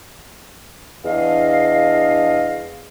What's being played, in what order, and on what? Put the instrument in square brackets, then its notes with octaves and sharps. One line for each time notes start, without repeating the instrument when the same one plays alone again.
[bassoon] E2 [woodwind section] D4 D#5 F5